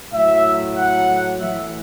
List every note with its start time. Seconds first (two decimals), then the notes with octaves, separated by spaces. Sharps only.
0.12 A2 F#3 E5
0.76 F#5
1.40 A2 E3 E5